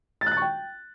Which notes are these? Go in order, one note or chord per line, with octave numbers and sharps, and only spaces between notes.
A6
F#6
A6
C#6
G5